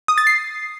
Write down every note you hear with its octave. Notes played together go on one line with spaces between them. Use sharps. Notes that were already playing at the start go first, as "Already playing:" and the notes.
D#6
A6
C7